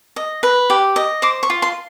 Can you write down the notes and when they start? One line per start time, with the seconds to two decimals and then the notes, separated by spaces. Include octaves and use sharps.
0.16 D#5
0.43 B4
0.70 G4
0.96 D#5
1.22 C5 D6
1.43 C#6
1.50 F4
1.62 C6